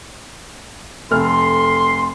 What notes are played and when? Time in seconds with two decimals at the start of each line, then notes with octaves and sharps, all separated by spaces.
1.11 F1 A4 C6 F6